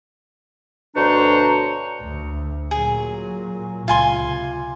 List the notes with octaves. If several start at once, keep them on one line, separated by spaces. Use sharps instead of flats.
D2 B2 D4 C5 C#5 A#5
D2
A#2 F#3 G#4
C#2 F4 G#5 C6
C3